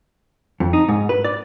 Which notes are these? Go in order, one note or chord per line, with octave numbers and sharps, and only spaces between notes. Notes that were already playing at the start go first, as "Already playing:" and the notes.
F2
D#4
G#2
B4
D5